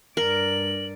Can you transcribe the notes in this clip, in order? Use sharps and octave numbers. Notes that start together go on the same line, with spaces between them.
G2 A#4 D5 F#7